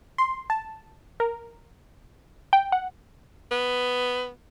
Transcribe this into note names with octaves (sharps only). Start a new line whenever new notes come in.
C6
A5
A#4
G5
F#5
B3